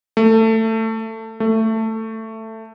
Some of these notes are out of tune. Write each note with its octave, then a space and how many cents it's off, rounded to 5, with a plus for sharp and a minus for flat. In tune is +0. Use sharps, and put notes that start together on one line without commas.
A3 +20
A3 +15